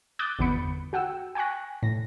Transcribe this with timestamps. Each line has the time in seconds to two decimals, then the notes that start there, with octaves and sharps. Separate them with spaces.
0.19 D6 D#6 F#6 G6 A6
0.39 G1 E2 D3 B3 B5 C#7
0.93 F#4 F#5 G5 E6
1.35 G5 G#5 C#6 F#6 A#6
1.83 A2 A#6